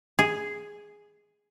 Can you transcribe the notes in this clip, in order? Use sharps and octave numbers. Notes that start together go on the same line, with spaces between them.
G#4